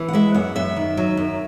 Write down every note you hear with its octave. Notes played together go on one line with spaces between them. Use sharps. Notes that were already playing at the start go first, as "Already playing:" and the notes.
Already playing: E3
F#5
G#3 E5
F#2 F#5
F#2 E5
D#3
F#3
F#2